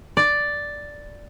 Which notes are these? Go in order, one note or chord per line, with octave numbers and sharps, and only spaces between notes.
D5